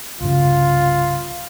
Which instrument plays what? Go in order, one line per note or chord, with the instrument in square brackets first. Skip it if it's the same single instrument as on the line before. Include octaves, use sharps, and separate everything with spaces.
[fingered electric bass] C2 G2 C#3 [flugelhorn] F4